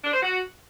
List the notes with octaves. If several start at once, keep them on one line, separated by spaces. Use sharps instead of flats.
D4
C5
F#4